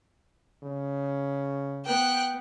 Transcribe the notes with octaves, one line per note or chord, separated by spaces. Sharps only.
C#3
B3 G5 F#6